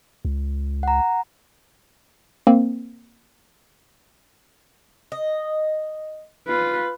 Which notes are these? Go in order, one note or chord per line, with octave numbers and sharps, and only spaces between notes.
C#2
F#5 A#5
A#3 C4
D#5
F4 B4